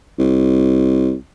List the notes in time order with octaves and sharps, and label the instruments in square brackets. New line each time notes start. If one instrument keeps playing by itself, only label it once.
[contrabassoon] C2